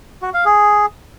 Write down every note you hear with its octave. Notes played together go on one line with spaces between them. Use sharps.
F#4
F5
G#4